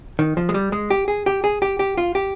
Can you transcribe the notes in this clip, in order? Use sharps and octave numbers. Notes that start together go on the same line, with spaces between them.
D#3
F3
G#3
G3
G#3
G4
G#4
G4
G#4
G4
G4
F4
G4